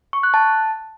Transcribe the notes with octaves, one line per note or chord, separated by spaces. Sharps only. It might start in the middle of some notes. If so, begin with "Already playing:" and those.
C#6
F#6
A5